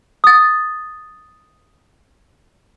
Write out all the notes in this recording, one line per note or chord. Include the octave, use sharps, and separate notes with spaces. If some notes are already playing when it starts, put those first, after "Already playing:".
D#6 A6